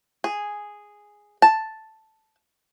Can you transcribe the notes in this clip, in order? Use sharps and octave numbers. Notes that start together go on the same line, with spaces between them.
G#4
A5